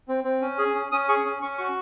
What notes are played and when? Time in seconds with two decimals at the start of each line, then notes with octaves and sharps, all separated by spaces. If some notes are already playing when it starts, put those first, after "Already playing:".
0.08 C4
0.24 C4
0.41 C#4
0.58 G#4
0.75 C#4
0.92 C#4 D#6
1.09 G#4 C#6
1.25 C#4
1.42 C#4 C#6
1.58 F#4 C#6